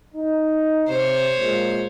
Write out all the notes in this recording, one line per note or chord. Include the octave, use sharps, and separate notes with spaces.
D#4
C3 C5 C#5
A#2 G#3 A#3